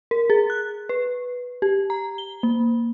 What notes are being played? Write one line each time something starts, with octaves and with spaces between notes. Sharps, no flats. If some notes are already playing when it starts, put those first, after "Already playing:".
A#4
G#4
F#6
B4
G4
A#5
G7
A#3